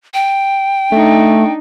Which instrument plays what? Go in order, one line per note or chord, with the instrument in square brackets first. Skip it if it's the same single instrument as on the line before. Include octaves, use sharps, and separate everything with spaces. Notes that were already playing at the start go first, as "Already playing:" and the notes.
[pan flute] G5
[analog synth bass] A3 [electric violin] D4 D#4